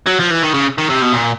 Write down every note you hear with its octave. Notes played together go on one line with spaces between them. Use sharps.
F#3
F3
E3
D#3
C#3
D#3
C3
B2
A#2